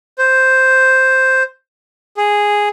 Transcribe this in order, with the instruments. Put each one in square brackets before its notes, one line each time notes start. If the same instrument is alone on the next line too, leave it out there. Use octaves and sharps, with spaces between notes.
[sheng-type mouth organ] C5
G#4